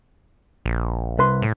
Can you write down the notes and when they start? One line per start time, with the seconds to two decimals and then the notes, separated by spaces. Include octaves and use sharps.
0.66 A#1
1.18 C2 B4 C6
1.42 A2